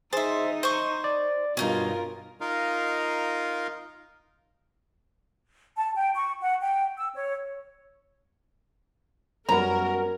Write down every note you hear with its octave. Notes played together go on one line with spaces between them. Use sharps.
D#4 G#4 C5 D#5 E5 A6
C5 C#6 G6
D5
G2 B2 C#4 D#4 F4 A#4 F5
D#4 F4 A#4 D#5 F5
A5
G5
C#6
F#5
G5
E6
C#5
F#2 G3 B3 C#4 F#4 A#4 A#5